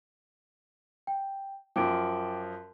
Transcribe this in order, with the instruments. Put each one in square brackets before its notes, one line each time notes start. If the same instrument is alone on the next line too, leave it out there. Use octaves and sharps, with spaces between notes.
[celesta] G5
[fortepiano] F#2 F3 [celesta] G5 D6 D7